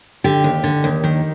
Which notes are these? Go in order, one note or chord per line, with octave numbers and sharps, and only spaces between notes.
D3 G4
D#2
D3
D#2
D#3